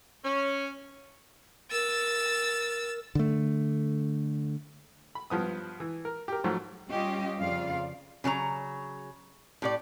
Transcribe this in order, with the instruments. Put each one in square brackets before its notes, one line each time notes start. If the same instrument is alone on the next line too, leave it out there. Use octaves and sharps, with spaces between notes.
[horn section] C#4
[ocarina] A#4 [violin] E6 A6
[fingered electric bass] D3 A3
[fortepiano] B5
G2 F3 B3 D#6
E3
A#4
G4 A#4
G#2 F3 F#3 A3
[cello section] G3 C#4 F4 G4 D#5
F2 C#3 F4 D5 F5
[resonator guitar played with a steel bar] C#3 F#3 A4 A#5
A2 G4 D5